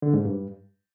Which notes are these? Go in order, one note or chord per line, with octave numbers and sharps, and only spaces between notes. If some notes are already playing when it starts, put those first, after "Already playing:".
D3
G#2
G2